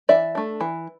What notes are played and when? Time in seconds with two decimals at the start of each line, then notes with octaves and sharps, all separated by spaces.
0.09 E3 D5 E5
0.35 A3 D4
0.61 E3